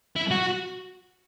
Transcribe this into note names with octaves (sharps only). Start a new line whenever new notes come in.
E4
F#4